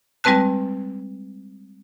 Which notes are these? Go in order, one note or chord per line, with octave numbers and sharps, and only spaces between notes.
G3 G#3 C4 B4 A5 F#6